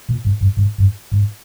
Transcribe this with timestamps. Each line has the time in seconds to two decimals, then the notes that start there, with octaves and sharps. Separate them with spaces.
0.09 A#2
0.25 G#2
0.41 G2
0.57 G#2
0.78 G2
1.12 G#2